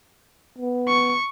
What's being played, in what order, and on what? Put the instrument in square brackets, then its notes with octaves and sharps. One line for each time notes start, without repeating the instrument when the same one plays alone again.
[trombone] B3
[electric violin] C#6